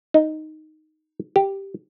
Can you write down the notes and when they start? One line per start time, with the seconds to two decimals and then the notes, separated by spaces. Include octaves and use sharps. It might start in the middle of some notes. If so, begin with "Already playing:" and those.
0.14 D#4
1.36 G4